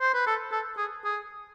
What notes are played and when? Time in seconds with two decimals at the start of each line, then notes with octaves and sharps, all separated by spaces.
0.01 C5
0.14 B4
0.27 A4
0.52 A4
0.78 G#4
1.04 G#4